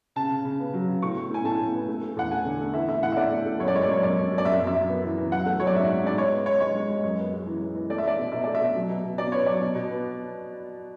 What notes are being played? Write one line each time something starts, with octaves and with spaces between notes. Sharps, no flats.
C#3 A5
C#3
C#3
B3
F#3
C#3
A2 C#6
A2
A2 G#5
A2 A5
A2
B3
A3
A3
E2 F#5
A3 G#5
D3
A3
E3 E5
A2 E5
A2 F#5
E5
A2 D5
A3
A3
F#2 C#5
D5
G#3 C#5
D5
F#2 C#5
F#2 D5
F#2
F#2
D5
F#2 E5
F#2
E5
F#2
B3
E3
E3
F#3 F#5
A3
F#3 C#5
D5
G#2 E5
G#2
G#2 D5
G#3 C#5
B3
B3 C#5
G#3 C#5
G#3
G#3
F#2
B3
G#3
E3
G#3
E3
A3 D5
E5
A3 D5
B2
B2 E5
A3 D5
E5
B2
F#3
B2
B2
B2 D5
B3 C#5
F#3 D5
B2
B2
B3